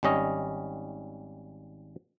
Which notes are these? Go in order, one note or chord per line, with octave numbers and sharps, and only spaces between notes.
G#1 G3 C#4 D#5